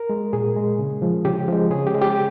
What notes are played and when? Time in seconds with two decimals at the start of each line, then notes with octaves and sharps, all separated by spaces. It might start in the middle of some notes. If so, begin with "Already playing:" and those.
Already playing: A#4
0.10 G#3
0.33 A#2 G#4
0.56 G#3
0.79 C#3
1.02 F3 G#3
1.25 C#3 G4
1.48 F3 G#3
1.71 C#3 G#4
1.87 G4
1.94 G#3
2.02 G4